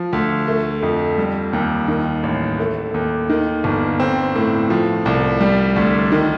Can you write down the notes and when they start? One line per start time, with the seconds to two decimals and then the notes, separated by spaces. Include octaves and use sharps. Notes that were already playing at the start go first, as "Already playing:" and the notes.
Already playing: F3
0.13 D2
0.48 A3
0.83 F2
1.18 G3
1.53 D#2
1.88 D#3
2.23 A1
2.59 A3
2.94 D#2
3.30 D#3
3.64 G1
4.00 C4
4.36 A2
4.70 F3
5.06 C2
5.41 G3
5.76 D2
6.12 D#3